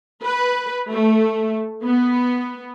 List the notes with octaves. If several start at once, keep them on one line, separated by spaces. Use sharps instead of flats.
B4
A3
B3